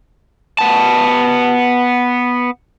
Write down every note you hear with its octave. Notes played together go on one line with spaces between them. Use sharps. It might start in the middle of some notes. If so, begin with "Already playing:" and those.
B3 A5